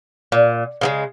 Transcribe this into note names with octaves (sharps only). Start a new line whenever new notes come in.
A#2
C#3 F3 G#3